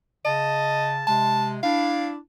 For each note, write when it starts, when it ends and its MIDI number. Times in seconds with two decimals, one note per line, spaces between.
0.25 1.03 49
0.25 0.91 75
0.25 1.03 81
1.07 1.58 48
1.07 1.58 56
1.07 1.50 81
1.63 2.18 62
1.63 2.18 64
1.63 2.08 77